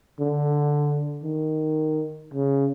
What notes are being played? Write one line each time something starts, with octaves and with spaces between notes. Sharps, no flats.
D3
D#3
C#3